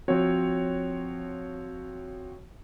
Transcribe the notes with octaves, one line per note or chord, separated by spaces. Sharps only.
F3 C4 F#4 C#5